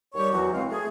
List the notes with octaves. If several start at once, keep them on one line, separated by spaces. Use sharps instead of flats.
D#2 G3 G4 C#5 C#6
E2 F#3 F#4
C#2 G#3 C4 F5
A3 G#4